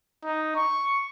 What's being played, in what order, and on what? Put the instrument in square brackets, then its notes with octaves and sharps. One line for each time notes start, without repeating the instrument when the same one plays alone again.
[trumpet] D#4
C#6